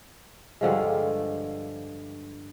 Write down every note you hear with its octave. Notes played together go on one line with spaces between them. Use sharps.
G2 D3 F3 G#3